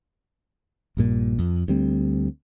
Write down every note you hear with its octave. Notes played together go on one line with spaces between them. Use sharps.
A#1 G2 A#2
F2
D2 G3 C4